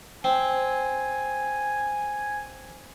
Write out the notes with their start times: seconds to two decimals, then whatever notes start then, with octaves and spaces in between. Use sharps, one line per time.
0.24 C4 G#5